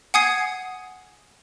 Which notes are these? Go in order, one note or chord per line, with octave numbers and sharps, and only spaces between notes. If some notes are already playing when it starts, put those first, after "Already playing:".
F#5 G#5 D#6 G#6 C7